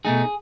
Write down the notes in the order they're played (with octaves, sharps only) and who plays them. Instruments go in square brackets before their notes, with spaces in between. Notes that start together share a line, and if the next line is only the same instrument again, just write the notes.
[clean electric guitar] B2 A3 D#4 G#4